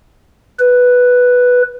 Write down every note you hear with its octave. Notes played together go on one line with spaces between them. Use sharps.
B4